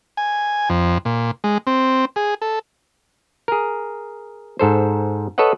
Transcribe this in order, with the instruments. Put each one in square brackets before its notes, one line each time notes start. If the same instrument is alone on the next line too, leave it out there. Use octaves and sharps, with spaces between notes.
[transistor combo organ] G#5
F2
A#2
G#3
C4
G#4
A4
[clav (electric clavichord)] G#4 A#4
G#2 A4 C5
A4 B4 C#5 D#5 F#5